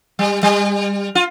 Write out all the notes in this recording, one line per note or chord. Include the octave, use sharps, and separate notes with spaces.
G3
G3
F4